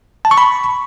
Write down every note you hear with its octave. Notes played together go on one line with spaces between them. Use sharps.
A5
C#6
B5